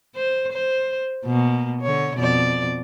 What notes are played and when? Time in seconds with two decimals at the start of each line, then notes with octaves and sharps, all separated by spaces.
0.16 C5
0.53 C5
1.26 B2 A#3
1.81 D3 C#5
2.16 F2 B2 D5